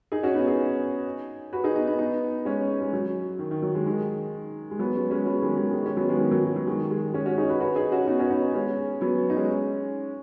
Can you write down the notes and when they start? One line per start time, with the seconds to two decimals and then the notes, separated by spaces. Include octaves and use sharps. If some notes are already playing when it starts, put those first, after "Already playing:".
0.12 D#4 G#4
0.23 C#4 F#4
0.35 B3 D#4
0.47 D#4 G#4
1.53 F#4 B4
1.64 D#4 G#4
1.76 B3 D#4
1.87 B3 D#4
1.99 B3 D#4
2.45 G#3 C#4
2.81 G#3
2.93 F#3
3.39 D#3
3.51 D#3
3.62 F#3
3.74 D#3 G#3
3.86 D#3 G#3
4.71 G#3
4.79 F#3 B3
4.95 G#3 C#4
5.11 G#3 C#4
5.26 F#3 B3
5.38 B3
5.42 D#3 G#3
5.57 D#3 G#3
5.73 D#3 G#3
5.85 G#3 C#4
5.96 F#3 B3
6.09 D#3 G#3
6.15 B3
6.20 D#3 G#3
6.31 F#3
6.43 F#3
6.56 F#3
6.67 D#3 G#3
6.91 D#3 G#3
7.13 G#3 C#4
7.25 C#4 F#4
7.38 D#4 G#4
7.49 F#4 B4
7.60 F#4 B4
7.76 D#4 G#4
7.92 C#4 F#4
8.07 B3 D#4
8.19 C#4 F#4
8.30 B3 D#4
8.42 B3 D#4
8.54 G#3 C#4
9.01 F#3 B3
9.30 D#4
9.36 G#3 C#4